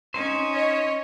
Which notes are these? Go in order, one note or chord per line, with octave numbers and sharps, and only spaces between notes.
C#4 D#4 C5
C#5 D#5